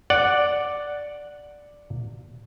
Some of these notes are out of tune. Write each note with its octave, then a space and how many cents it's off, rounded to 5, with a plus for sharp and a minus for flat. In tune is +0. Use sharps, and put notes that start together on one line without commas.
D5 +0 F#5 +0